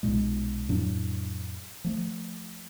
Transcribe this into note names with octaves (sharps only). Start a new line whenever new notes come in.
B1 A#2 G#3
F2 A2 F#3 D4
F3 A3